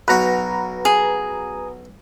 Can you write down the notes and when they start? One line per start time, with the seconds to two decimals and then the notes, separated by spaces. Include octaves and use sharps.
0.08 B1 F#4 B4 A#5
0.85 G#4